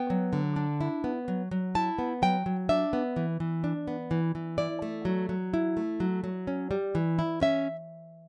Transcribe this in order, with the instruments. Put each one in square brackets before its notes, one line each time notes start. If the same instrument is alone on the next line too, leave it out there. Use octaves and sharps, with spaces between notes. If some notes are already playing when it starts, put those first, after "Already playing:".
Already playing: [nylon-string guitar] B3 G5
F#3
D3
D4
E4
B3
F#3
F#3
E4 A5
B3
F#3 G5
F#3
D4 E5
B3
E3
E3
D4
B3
E3
E3
E4 D5
A3
F#3
F#3
E4
A3
F#3
F#3
C#4
G3
E3
E4
C#4 E5